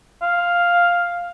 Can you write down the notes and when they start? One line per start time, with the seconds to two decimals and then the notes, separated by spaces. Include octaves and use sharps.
0.22 F5